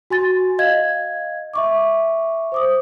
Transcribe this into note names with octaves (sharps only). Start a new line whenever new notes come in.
F#4 G#5 C6 A6
D#5 F5 G#6
E5 C#6 D6
C5 D6 D#6